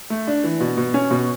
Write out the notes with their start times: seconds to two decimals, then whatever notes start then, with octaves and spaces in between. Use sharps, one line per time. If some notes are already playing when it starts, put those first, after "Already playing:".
0.10 A3
0.27 D4
0.44 E3
0.60 B2
0.77 B2
0.94 C#4
1.11 B2